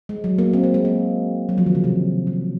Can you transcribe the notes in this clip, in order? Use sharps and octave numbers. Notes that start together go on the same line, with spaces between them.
G#3
F#3
A#3
C4
A#3
G#3
A#3
F#3
F3
D#3
C#3
C3
C#3